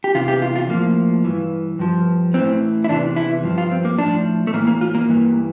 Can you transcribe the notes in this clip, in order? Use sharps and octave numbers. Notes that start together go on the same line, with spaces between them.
G4
E2 C3 E3 F4
G4
F4
F4
A2 F3 A#3
G2 E3
G2 F3
A2 E3 C4
E4
E2 C3 E3 D4
E4
G2 F3
F4
C4
A#3
A2 F3 D4
A3
A2 E3 A#3
A#3
F4
A#3
G2 E3